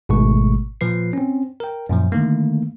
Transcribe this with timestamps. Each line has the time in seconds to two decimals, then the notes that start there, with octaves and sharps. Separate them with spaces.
0.09 G#1 G#2 B2 G#3 A3 C#6
0.81 A#2 F3 B4 C7
1.13 C4 C#4
1.60 A#4 G5
1.89 F#2 A#2 F3
2.12 D3 D#3 A3 A#3